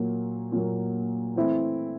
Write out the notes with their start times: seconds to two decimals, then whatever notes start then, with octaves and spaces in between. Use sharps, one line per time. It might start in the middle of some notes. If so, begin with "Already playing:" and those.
Already playing: A#2 F#3 A#3
0.52 A#2 F#3 A#3
1.36 E3 A3 C4 E4